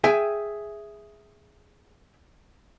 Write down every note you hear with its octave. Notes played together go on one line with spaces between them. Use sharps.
G#4 E5 G5 G#5